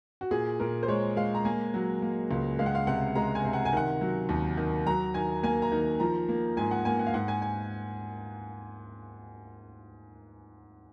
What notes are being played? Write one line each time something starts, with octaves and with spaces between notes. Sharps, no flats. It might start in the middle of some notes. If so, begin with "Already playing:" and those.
F#4
A#2 G#4
A#2 A#4
C5
G#3 C#5
G#3 F5
A#5
A#3 G#5
F#3
A#3
C#2
G#3 F5
F#5
F5
C3 F#5
G#3 A#5
G#5
C3
F#5
G#5
D#3 F#5
F#3
D#2
D#3
F#3 A#5
D#3 G#5
A#3 G#5
A#5
D#3
F3 A#5
A#3
G#2 G#5
F#5
A#3 G#5
F#5
F5
G#2 F#5
G#5
G#5